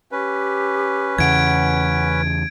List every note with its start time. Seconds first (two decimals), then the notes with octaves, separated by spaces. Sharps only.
0.12 C#4 G4 B4
1.18 E2 C#3 F#5 G#6 D7